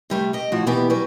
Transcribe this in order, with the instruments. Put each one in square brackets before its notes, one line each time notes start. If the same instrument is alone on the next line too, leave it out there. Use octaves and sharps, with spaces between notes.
[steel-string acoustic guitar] C3 G3 A3
G4 D#5
A2 F3 F#4
B2 E3 B3 G4
F#3 G3 B4